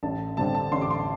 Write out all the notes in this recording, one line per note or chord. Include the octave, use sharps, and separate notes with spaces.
A1 A5
G2 D3 G3 C4 A5
A5
A1 C6
D6
C6